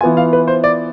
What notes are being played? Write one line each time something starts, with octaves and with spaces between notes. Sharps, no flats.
E3 B3 F4 G#5
F5
B4
C5
D5